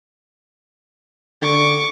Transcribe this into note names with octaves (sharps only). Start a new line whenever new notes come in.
D3 C#6 D6